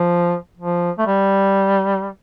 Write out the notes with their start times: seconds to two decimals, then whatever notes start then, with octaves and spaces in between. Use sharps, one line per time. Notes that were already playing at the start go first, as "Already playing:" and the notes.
Already playing: F3
0.57 F3
0.98 A3
1.07 G3